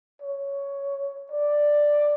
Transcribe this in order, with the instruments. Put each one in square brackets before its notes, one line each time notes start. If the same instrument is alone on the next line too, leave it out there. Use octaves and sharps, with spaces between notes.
[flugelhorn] C#5
D5